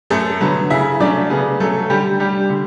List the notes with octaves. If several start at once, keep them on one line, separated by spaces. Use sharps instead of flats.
F#2 A3 A4
D3 F#3 B3 B4
C#3 E4 E5
F#3 A3 C#4 D4 D5
C#3 B3 B4
F#3 A3 C#4 A4
D3 G3 G4
G3 D4 G4
D3